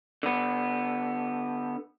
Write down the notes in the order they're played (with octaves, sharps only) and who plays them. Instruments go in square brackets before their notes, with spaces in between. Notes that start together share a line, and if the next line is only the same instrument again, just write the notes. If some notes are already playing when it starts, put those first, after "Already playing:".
[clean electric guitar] D3 B3